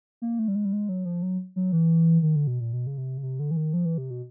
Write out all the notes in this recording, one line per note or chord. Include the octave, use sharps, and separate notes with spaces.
A#3
A3
G3
G#3
G3
G#3
F#3
F3
F#3
F#3
E3
D#3
D3
B2
A#2
B2
C#3
C3
C#3
C3
D3
E3
D#3
F3
E3
C3
B2